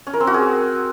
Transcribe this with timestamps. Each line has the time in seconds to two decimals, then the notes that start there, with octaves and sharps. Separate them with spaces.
0.07 C#4
0.13 A#4
0.20 C4
0.27 F#4
0.34 G#4